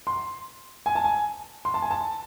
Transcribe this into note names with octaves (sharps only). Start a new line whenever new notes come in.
C6
G#5
A5
G#5
C6
A5
G#5
A5